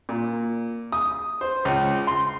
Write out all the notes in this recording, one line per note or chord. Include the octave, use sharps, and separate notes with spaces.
A#2
D#6
C5
C#2
C6